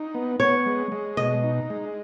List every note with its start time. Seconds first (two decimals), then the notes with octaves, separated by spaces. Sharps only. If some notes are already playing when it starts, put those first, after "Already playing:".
Already playing: D#4
0.14 B3
0.40 B3 C#5
0.66 G#3
0.92 G#3
1.17 B2 D#5
1.44 D#4
1.70 G#3